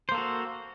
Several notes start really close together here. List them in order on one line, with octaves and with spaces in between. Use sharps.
C5 A#3 A4 F#4